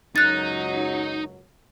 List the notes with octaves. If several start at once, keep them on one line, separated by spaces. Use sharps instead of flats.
C#2 F#2 F#3 D#4 F#6 A6